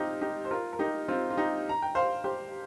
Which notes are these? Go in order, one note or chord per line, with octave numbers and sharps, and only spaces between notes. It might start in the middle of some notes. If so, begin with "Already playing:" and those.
Already playing: C4 D#4 F4 G4
D#4 G4
C5
F4 A#4
A#4
D#4 G4
C4 F4
F4
D#4 G4
A#5
G5
C5 F5
G4 C5